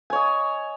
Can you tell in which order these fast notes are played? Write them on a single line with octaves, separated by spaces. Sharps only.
G#5 C#5 D#5